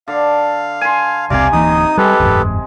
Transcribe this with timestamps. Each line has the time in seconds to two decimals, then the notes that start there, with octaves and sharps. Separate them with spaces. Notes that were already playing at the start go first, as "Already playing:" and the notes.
0.08 D3 F5
0.81 G#5 C6
1.30 E1 C2 C3 C4 D5 F5 G#5
1.52 D1 E3 A#3 D#4 D#6
1.97 G3 G#3 G4 A4 B4
2.20 F#1 E2 G#2